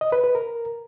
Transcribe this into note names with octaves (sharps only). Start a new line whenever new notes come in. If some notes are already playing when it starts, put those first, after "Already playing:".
D#5
B4
B4
A#4